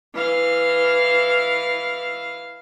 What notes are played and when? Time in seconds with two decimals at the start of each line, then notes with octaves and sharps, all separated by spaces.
0.15 E3 F5